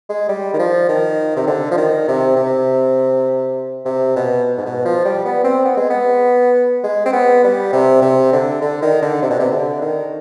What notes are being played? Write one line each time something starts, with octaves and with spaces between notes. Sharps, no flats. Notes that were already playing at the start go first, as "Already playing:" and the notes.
G#3
G3
D#3
F3
D#3
C3
D3
F3
D#3
C3
C3
C3
B2
G#2
B2
F3
G3
B3
C4
B3
G#3
B3
G#3
C4
B3
G3
C3
C3
D3
D3
D#3
D3
C3
B2
C3
D3
D#3